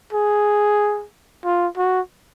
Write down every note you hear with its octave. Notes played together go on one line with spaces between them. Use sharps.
G#4
F4
F#4